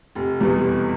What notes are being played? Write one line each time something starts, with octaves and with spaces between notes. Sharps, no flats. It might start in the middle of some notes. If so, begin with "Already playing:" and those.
F1
E2 B2 G3 B3
F1